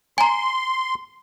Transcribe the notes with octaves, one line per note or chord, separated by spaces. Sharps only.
G#5 A#5 C6